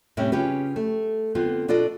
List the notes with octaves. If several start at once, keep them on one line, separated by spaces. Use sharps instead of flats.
A2 C3 G3 C4 C#4
C#3 C#4 F4 G4 B4
A3
D3 B3 C4 F4
B2 D4 F4 A4 D5 D#5